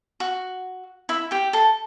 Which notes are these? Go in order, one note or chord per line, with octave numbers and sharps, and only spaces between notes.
F#4
E4 E5
G4 G5
A4 A5